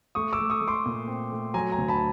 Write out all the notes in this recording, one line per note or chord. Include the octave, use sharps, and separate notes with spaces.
A3 C#6 D#6
D6 E6
A3
C#6 D#6
A3
C6 D6
A#2
C4
A3
F#3 G#5 A#5
G#5 A#5
D2
A5 B5